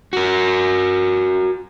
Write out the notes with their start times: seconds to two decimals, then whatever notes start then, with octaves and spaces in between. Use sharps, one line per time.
0.13 F#4 A#4